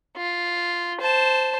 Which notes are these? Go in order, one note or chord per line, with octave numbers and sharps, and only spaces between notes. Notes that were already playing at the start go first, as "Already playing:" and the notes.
F4
C5 A5